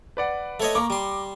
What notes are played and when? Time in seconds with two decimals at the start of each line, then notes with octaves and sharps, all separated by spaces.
0.17 B4 D5 F#5
0.60 A3 C#5 D#5
0.75 A#3 A#5 C#6 D6
0.90 G3 C6